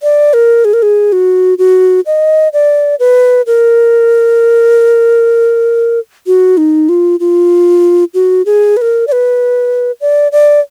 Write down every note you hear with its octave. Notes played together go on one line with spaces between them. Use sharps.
D5
A#4
G#4
A#4
G#4
F#4
F#4
D#5
D5
B4
A#4
F#4
D#4
F4
F4
F#4
G#4
B4
A#4
D5
B4
D5
D5